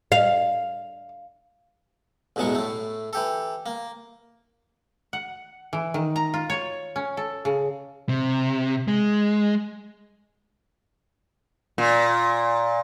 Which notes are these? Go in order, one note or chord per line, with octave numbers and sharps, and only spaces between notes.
F5
A1 E2 B2 F#3 G#3 C#6
A2 A3
E3 G4 A4
A#3
F#5
E3
D#3
A#5
F4
C#5
C#4
A4
C#3
C3
G#3
A#2